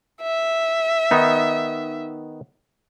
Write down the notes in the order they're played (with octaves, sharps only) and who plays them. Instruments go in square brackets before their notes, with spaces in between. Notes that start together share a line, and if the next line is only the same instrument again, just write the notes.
[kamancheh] E5
[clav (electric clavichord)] D#3 B3 D#4